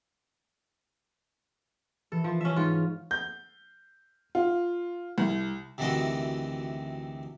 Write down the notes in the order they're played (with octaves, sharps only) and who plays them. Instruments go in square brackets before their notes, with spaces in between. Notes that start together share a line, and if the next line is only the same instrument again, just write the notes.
[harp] E3 [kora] A4
[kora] F3
C#4 E5
G#2 F4
[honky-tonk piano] G6
F4
C2
[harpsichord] D2 C3 D#3 E3 F#4 D#5